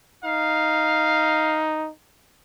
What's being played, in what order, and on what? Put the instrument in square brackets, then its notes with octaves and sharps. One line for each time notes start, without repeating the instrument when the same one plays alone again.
[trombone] D#4 [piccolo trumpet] F5